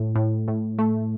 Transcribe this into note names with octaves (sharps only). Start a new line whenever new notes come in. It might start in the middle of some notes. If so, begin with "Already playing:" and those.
Already playing: A2
A2
A2
A3